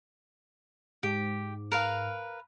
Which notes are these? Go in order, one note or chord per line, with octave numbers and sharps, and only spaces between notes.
G#2 G4
A#4 B4 F5